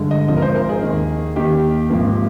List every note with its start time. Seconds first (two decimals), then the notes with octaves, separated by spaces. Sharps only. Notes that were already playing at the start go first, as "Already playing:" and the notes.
Already playing: G2 D3 G#3
0.11 D#5
0.28 G#1 G#2 F3 D#5
0.37 A#4
0.42 C5
0.55 A#4
0.69 G#4
0.82 D#2 D#3 A#3
1.35 D#2 D#3 A#3 G4
1.90 G#1 G#2 F3 A#3